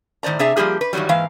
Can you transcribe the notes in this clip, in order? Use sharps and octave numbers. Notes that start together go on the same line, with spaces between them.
A2 D#3 C5 D5 A#5
C3 D4 G#4 E5 A#5
F3 G3 A#3 G4 G#4
B4
G2 D#3 E3 F#3 G3
G#2 E3 A#3 F5